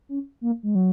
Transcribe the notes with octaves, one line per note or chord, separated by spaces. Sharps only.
C#4
A#3
G#3
F#3